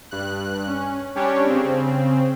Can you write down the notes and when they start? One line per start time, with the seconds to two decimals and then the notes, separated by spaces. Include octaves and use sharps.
0.11 G2 F#6
0.67 C#4
1.15 G3 C#4 D4 G4 C#5
1.46 C#3 C4